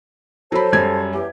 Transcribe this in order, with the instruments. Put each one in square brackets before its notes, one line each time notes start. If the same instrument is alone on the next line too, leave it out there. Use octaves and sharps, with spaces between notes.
[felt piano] F#3 B5 [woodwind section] A4 C5
[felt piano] F#2 G3 G#6
[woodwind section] E2 G4